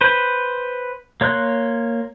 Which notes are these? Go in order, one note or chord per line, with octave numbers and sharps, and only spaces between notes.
B4 C5
A#3 C#5 C6 F#6